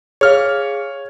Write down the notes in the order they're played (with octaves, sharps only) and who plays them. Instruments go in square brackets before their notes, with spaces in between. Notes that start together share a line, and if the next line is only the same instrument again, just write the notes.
[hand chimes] G#4 F5 [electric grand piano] C#5 F6